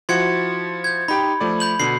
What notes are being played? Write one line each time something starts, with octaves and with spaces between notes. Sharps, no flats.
F3 E4 F#4 C6 G#6 C#7
G6 G#6
D#4 G4 G5 B5
F3 A3 D5
B5 G6 F#7
B2 D3 C7 F#7